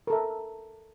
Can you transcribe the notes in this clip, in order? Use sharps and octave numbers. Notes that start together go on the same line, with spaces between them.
A4 A#4 E5